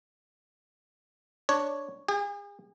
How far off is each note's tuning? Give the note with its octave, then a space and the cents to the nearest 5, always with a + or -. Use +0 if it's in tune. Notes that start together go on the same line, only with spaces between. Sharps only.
D4 +0 C#5 +0
G#4 -40 G5 +35